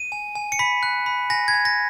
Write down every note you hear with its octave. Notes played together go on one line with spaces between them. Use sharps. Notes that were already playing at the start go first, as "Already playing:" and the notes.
Already playing: D#7
G#5
G#5
C#7
B5 B6
F#6
B5
G#5 A#6
G#6
G#5
A#6